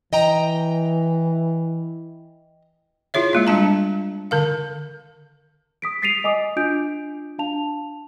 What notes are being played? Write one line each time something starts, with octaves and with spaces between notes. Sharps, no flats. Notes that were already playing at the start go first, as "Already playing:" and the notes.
E3 D#5 G5 A#5
E4 F4 G#4 C#5 E5
G#3 A#3 F4
G3 D4 A5 A#5
D3 A#4 F5
D#6 B6 D7
A6 B6 C7 D7 D#7 F7
D#5 G#5 D6 D#6
D4 F4 D#5 G#5 G6 D7
D4 F5 A5 F7